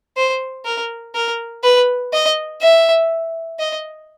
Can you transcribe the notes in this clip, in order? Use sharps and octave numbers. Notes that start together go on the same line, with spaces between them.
C5
A#4
A#4
B4
D#5
E5
D#5